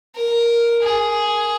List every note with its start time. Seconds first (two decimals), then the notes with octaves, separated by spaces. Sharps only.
0.15 A#4
0.83 G#4